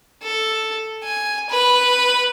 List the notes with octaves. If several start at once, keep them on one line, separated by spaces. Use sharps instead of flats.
A4
G#5
B4